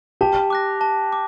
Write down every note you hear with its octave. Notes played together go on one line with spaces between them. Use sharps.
G4 A5
D6 F#6 A#6
A5
D6